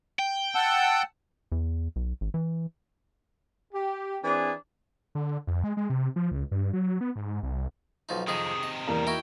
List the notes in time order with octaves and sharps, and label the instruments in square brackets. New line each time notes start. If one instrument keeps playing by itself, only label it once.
[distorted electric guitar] G5
[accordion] F#5 A5 E6
[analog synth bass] E2
B1
G#1
E3
[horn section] G4
E3 C4 D4 G#4
[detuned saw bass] D3
F2
G#3
G#3
C3
F3
C#2
G2
F#3
B3
G#2
C2
[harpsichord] B1 F3 D#4
[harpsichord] F2 D#4 D#5 [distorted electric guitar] C3 D#3 [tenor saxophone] G#4
[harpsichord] D#5
[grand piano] E2 A#3 A#5 [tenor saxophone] G3
[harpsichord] D#4 E4 F#4 [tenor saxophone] A#4 [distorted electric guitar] G5